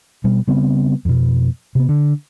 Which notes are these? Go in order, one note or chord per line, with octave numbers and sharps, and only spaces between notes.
B2 G3
C#3 G3 B3 C4
F2 B2
C3 B3
D3